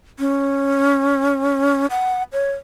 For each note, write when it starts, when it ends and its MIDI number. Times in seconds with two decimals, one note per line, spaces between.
0.19 1.86 61
1.90 2.23 78
2.32 2.52 73